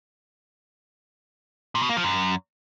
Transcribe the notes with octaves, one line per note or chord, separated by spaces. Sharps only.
A#2
B2
A#3
F3
F#2